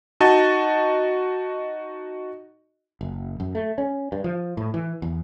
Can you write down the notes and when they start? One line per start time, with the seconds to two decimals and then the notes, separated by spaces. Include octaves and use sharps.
0.20 D#4 F#4 D#5 A5
3.01 F#1
3.40 F#2
3.55 A3
3.78 C#4
4.12 G2
4.24 F3
4.57 A2
4.74 E3
5.02 E2